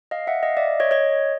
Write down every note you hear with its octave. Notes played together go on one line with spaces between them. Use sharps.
D#5 F5
E5 F#5
D#5 F5
D5 E5
C#5 D#5
C#5 D#5